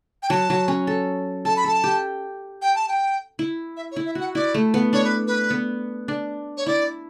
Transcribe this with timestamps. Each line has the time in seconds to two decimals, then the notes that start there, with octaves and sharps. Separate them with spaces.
0.23 G5
0.30 F#3 A5
0.50 F#3
0.68 C#4
0.87 A4
1.45 A4 A5
1.56 B5
1.64 A4 A5
1.84 G4
2.62 G5
2.75 A5
2.89 G5
3.39 E4
3.77 E5
3.91 C#5
3.96 E4
4.06 E5
4.15 F#4
4.20 F#5
4.35 E4 D5
4.54 A3
4.74 B3
4.93 D4 C#5
5.04 B4
5.27 B4
5.50 B3
6.08 D4
6.57 C#5
6.66 E4 D5